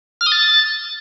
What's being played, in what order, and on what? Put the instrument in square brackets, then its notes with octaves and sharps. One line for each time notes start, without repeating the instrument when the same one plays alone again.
[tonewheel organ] F6
D#6
A6